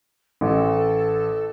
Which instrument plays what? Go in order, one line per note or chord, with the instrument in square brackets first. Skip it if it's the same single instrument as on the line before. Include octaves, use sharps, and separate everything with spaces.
[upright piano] A1 [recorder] A4